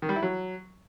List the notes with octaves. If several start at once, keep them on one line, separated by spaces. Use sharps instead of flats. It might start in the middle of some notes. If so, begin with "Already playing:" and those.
D#3
G3
E4
F#3